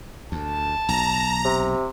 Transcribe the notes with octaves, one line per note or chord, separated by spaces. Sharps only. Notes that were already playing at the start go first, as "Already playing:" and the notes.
D2 A5
B1 A#5
C3